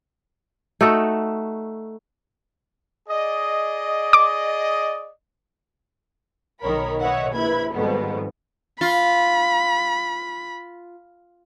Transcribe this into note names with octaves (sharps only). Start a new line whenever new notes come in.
A3 D#4 F#4 A4
G#4 D5 D#5
D6
B1 D#3 A#4 C#5 B5
B4 C#5 D#5 E5 F#5
A#1 E4 B4 B5 G#6
F2 G#2 B2 D#3 G3 B3
F4 B5